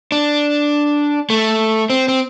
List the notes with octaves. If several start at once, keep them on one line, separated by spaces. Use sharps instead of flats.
D4
A3
C4
C4